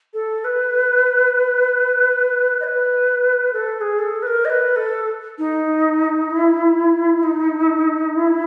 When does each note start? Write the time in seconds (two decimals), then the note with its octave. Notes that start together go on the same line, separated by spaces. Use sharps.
0.13 A4
0.44 B4
2.60 D#5
2.64 B4
3.53 A4
3.76 A4
3.81 G#4
3.98 A4
4.22 B4
4.27 A#4
4.45 D#5
4.50 B4
4.76 A4
5.38 D#4
6.30 E4
7.23 D#4
8.16 E4